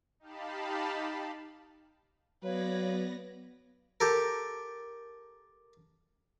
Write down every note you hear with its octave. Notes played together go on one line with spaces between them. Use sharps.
D#4 G4 F5 A5 B5
F#3 B3 B4 C#5 D5 F5 A#6
G4 A4 A#4